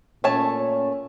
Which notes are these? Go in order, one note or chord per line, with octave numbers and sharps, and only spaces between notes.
A#2 A3 C#4 C#5 A5